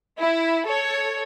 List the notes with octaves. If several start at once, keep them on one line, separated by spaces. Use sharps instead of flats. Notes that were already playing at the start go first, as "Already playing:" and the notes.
E4
A4 C#5